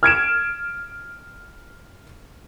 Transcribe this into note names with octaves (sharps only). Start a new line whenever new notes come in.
F6 G#6 D7 E7